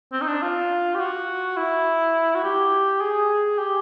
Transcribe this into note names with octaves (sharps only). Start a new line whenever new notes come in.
C4
D#4
D4
F4
G4
F#4
E4
F#4
G4
G#4
G4